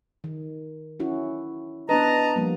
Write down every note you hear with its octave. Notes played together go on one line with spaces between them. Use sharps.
D#3
C#4 E4 F#4
B3 D4 B4 D#5 A5 A#5
F3 G3 A#3